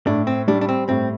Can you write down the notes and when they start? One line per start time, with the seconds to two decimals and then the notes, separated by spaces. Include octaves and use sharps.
0.07 A2 D4
0.27 C4
0.48 G3 D4
0.61 D4
0.69 C4
0.89 A2 C4